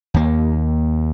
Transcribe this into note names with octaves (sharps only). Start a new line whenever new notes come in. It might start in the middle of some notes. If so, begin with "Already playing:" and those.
D#2 A#3